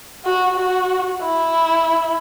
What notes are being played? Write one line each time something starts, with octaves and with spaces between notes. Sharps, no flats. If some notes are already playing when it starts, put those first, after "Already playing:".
F#4
F#4
E4